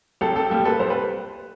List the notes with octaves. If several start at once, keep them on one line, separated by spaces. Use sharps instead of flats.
C2 G4 A4
G4 A4
A#2 G3 A#3 G4 A4
A4 B4
C2 C5
B4